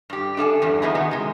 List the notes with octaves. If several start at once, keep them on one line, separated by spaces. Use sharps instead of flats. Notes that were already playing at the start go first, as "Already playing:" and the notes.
G2 G4
D4 A4 F5 G#5
E2 G2 E3
A#3 B3 D#4 E4 G#4
B2 D#3 B3 F#4
C3 G#3